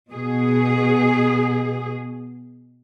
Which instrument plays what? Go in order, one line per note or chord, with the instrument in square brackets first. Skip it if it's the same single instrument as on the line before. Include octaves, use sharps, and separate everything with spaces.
[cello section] B2 G#4